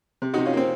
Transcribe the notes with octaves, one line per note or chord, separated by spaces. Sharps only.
C3
D#4 F#4
C3
C#4 F4
A#3 C4